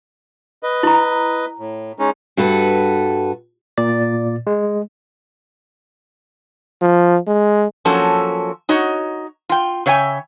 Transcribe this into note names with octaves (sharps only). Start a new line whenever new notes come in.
B4 D#5
E4 A#5
A2
G#3 C#4 D#4
G2 F#4 A4 B4
A#2 D5 A6
G#3
F3
G#3
F3 F#3 A#3 C#4 A4
D#4 F#4 C#5 D#5
F4 G5
C#3 C#5 E5 G5 G#5